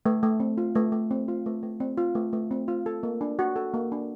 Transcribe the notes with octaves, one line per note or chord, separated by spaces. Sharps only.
A3
A3
C4
F4
A3
A3
C4
F4
A3
A3
C4
F4
A3
A3
C4
F4
A4
A#3
D4
F#4
A4
A#3
D4